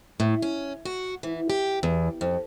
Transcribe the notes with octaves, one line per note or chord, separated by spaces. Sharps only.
A2
C#4
F#4
E3
G4
E2
F2